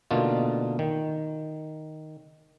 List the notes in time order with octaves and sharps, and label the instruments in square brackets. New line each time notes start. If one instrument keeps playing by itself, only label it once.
[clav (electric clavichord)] B2 D3 A3 A#3 D#4 F4
D#3